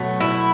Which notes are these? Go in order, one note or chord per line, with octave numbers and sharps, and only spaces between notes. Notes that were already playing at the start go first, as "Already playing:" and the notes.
Already playing: B2 F#3 A3
E4